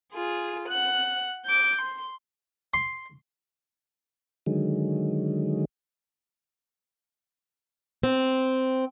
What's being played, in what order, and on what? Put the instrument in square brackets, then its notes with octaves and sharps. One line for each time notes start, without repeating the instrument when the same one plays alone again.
[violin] F4 G#4
F#5 F#6
D6 G6
C6
[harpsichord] C6
[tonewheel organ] D3 D#3 F#3 G#3
[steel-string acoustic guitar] C4